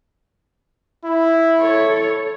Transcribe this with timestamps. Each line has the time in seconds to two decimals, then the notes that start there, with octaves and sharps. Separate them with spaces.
1.04 E4
1.61 A4 C#5